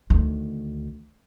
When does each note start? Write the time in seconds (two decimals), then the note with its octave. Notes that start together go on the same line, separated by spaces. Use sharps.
0.10 D2 D#3